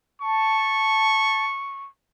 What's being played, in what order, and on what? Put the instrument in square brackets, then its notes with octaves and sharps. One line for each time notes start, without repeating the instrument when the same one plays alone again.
[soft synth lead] A5 [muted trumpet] C#6